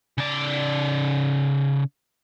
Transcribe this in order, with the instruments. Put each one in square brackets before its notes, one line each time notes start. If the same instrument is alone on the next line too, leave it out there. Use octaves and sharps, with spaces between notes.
[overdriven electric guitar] C#3 D5